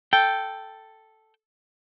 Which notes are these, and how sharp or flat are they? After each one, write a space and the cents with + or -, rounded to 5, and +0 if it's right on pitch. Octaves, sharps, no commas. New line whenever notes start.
A4 +0 G5 +0